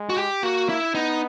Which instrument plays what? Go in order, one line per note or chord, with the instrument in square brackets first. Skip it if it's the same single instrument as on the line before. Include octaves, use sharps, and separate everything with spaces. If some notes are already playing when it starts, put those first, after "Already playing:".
Already playing: [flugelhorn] G#3
[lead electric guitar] F#4
G4
[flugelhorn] A#3 [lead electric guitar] F#4
[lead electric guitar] E4
[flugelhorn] B3 [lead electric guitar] D#4